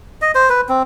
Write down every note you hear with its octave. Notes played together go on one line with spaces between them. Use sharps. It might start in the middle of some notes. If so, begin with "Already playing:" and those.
D#5
C5
B4
C4